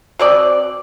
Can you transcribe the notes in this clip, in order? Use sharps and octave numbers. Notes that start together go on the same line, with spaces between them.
B2 C4 D5